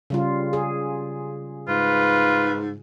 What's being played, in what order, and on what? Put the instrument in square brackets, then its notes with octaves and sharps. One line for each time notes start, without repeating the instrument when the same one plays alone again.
[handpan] C#3 G3 F4
G#4
[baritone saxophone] G#2 [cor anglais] F4 [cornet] B4